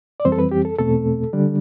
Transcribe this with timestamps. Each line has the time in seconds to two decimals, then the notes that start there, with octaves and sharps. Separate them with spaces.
0.20 D5
0.25 F2 E3 G3 C4 C5
0.32 A4
0.39 B4
0.51 G4
0.65 A4
0.78 E2 B2 A3 C4 A4
1.33 D3 G3 D4